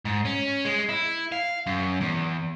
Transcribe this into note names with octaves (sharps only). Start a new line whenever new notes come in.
G#2
C#4
G#3
E4
F5
F#2
E2